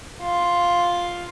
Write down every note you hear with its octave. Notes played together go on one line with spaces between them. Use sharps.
F4